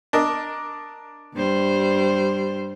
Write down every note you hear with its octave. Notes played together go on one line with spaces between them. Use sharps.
D4 A#4 D#5
G2 G3 C5